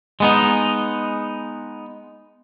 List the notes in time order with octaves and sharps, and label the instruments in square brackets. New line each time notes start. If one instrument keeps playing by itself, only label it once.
[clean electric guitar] G#3 B3 D#4